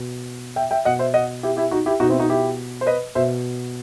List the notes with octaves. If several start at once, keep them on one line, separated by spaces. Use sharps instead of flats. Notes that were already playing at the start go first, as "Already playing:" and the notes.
Already playing: B2
E5 G5
E5 G5
B2 D#5 F#5
C5 E5
D#5 F#5
E4 G4
E4 G4
D#4 F#4
E4 G4
B2 D#4 F#4
C4 E4
D#4 F#4
E4 G4
C5
B4 D#5
B2 C5 E5